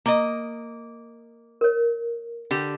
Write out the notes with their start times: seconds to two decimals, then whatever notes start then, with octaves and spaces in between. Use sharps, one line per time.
0.06 A#3 D#5
1.61 A#4 C#5
2.51 D3 G4